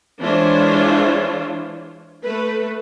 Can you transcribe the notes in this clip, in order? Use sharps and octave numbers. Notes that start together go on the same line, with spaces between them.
E3 G#3 D4 F4 C5 C#5
A3 B4